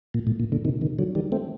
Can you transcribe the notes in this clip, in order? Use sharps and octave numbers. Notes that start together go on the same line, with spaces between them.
A#2
A2
A#2
A#2 D3
C3 D#3
C3 D#3
D3 F#3
D#3 G3
A3 C4